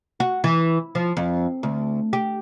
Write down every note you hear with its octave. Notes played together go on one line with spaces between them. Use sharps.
F#4
E3
F3
F2
D2
G4